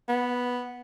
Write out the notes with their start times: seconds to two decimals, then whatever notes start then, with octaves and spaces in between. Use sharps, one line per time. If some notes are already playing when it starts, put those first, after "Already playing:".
0.09 B3